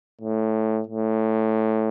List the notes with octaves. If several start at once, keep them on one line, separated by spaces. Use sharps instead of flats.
A2
A2